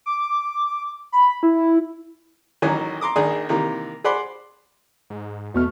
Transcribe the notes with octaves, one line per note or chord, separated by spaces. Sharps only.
D6
B5
E4
A1 D#3 E3 F#3 C#4 G#5
A#5 C6 D6 D#6
A#1 D#3 D4 G#4 D#6
C3 D#3 E3 A#3
G#4 C5 D5 F#5 B5 C6
G#2
E2 B2 A3 C#6 F6